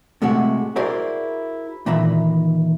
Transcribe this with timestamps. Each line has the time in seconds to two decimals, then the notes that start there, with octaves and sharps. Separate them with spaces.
0.22 A2 C3 G#3 A3 F#4
0.76 E4 F#4 G#4 A#4 C5 D5
1.86 A#2 D#3 E3 E5 A#5 B5